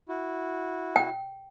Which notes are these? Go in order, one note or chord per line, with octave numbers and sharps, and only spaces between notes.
E4 F#4
G5